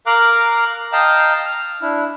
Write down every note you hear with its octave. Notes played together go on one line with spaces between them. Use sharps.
A#4 F5 A#5 D6 F#6
D#5 F5 G5 A5 A#5
F6
D4 E4